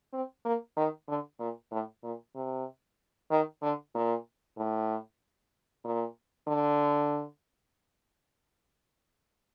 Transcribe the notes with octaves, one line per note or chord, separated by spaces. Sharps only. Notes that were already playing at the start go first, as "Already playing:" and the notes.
C4
A#3
D#3
D3
A#2
A2
A#2
C3
D#3
D3
A#2
A2
A#2
D3